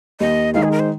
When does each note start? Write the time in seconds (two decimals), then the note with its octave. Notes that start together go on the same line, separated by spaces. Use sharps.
0.20 D#2 D#5
0.54 D#3 G#3 D#4 F5
0.63 G#4
0.72 A#4
0.79 C5